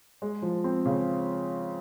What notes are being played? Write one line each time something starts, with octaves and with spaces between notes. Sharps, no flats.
G#3
F3
C4
C#3